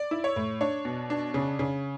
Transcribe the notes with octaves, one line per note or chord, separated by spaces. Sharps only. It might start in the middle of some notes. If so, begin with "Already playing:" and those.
Already playing: D5
E4
C#5
A2
D4 C#5
B2
D4
C#3
C#3